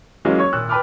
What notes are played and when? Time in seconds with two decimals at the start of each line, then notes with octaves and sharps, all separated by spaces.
0.25 E3 F#3 G#3 A#3 C#4 F4
0.39 C#5 C#6 G#6
0.53 G#1 A#2 E6 F#6
0.69 B4 G5 A5 B5 D6 F6